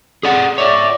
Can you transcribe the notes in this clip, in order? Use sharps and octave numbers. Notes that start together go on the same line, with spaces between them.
G#4 D5 F#5
C#5 D5 E5